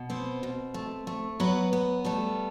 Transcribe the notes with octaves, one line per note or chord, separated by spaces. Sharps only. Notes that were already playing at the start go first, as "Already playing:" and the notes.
Already playing: B2
B3 C4 C5
B2
A3
A3
F#3 B3 B4
B3
G3 A3 A4